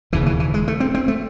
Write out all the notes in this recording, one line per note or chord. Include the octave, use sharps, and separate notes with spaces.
E1 D#2 C#3 E3
E3
E3
G#3
A3
C4
C4
A3